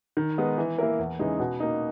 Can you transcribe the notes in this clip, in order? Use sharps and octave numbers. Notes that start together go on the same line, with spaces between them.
D#3
G#3 B3 D#4
E3
A#3 E4 A#4
E2
C#3 E3 G#3 D#4
B2
A#3 D#4